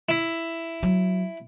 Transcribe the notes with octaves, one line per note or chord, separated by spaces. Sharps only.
E4
F#3